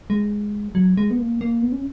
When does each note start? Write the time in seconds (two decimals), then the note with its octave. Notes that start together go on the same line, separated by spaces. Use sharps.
0.10 G#3
0.75 F#3
0.97 G#3
1.10 B3
1.18 A#3
1.41 A#3
1.62 B3
1.72 C#4